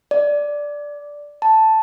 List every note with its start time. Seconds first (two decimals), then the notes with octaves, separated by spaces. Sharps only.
0.11 D5
1.42 A5